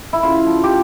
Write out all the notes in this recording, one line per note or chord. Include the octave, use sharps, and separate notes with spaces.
E4
C#3 F4
F3
G4